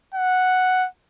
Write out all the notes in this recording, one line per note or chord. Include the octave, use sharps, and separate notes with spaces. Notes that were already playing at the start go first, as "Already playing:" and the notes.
F#5